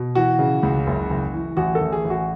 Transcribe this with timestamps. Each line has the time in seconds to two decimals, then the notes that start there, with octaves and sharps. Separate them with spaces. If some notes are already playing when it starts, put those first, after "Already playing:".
Already playing: B2
0.15 E3 F#4
0.39 C#3
0.63 C#2
0.87 F#1
1.10 F#1
1.33 E3
1.57 A1 F#4
1.75 A4
1.81 A1
1.92 G#4
2.04 A1
2.10 F#4